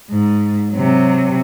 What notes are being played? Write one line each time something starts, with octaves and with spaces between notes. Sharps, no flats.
G#2
C3 F#3